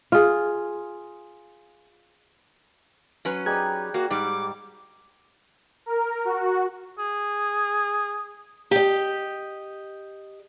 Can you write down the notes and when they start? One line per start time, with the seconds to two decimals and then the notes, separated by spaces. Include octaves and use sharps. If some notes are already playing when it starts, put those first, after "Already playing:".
0.12 F4 G#4
3.25 F#3 C#4 B4
3.46 D#4 G4 G#4 D5 F#6 G#6
3.94 A#3 F#4
4.10 G#2 G3 D6
5.86 A#4
6.25 F#4
6.99 G#4
8.71 G4 D#5